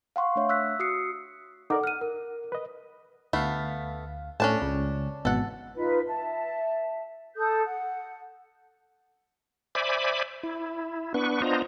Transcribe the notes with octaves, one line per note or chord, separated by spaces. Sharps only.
F5 F#5 C6 C#6
A3 D4 C#5 E5
E6 F#6 B6
F#4 D#6 E6 C7 C#7
D#4 A4 A#4 D5 F#5 D6
F#5 F6 D#7
A#4
B4 D#5
D2 A3 B3 F5
A2 C#4 D4 A5
C#2
G#1 E2 B2 A4 F#5
D#4 F4 B4
E5 A5
A4 D#6 G6
F#5
C5 D5 E5 G#5 B5 D6
E4
B3 D4 B4 C#6
B3 D4 F4 C5 D#5 A#5